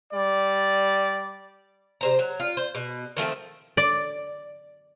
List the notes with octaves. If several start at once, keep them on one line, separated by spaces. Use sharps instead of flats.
G3 D5
C3 C5 A#5
F#3
F4
C5
B2
D#3 F3 A3 C4
D5